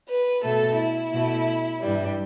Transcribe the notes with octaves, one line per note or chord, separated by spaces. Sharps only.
B4
B2 A3 A4
E4
B2 A3
G2 E3 G3